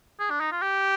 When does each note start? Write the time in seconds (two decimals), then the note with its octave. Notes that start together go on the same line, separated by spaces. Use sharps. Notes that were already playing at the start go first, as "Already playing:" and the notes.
0.20 G#4
0.30 D4
0.41 D#4
0.52 F4
0.62 G4